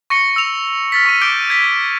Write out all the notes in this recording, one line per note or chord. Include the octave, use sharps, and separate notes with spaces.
C#6 A#6 C#7 G7
E6 F7
F6 A6 B6
C#6 D#7
D6 G6 D7 G7
G#6 B6